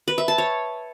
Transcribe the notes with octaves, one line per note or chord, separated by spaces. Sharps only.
B4
E5
A5
C#5